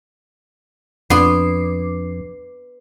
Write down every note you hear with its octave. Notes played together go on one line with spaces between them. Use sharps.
F2 B3 D4 C6 D6 C7